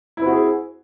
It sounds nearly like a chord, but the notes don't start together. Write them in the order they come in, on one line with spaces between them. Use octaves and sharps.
E4 C4 F#4 G#4